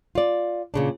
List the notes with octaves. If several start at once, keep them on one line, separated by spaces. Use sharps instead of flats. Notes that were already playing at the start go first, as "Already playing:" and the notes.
F4 D5
A#2 C#3 D4